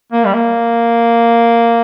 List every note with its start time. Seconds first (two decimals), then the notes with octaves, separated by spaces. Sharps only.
0.12 A#3
0.26 G3
0.34 A#3